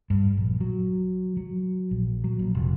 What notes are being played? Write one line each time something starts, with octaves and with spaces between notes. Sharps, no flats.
G2
A#1
F#3
F#3
A#1
F#3
A#1
F1